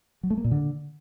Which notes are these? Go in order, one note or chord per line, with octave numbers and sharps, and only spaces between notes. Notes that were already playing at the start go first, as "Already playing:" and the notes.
F#3
A3
A#3
A#2
D3